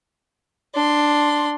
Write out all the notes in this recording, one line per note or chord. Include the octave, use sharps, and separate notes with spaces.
D4 C6